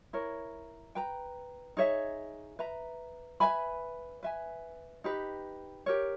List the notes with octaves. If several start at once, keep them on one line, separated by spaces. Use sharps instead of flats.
E4 A#4 C#5
B4 G5 A#5
D#4 G#4 C#5 E5
B4 E5 A#5
B4 E5 G#5 B5
B4 E5 G#5
D#4 G4 B4
G4 A#4 C#5